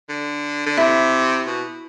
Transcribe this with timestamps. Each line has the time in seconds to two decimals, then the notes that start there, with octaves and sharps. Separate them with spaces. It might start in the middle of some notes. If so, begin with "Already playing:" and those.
0.09 D3
0.66 D3
0.77 C3 E4
1.46 B2